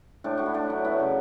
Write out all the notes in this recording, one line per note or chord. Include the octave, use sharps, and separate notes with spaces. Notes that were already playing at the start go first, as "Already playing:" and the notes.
A2 D4
A2 F#4
E4
A3 D4
F#3
B3 E4
C#3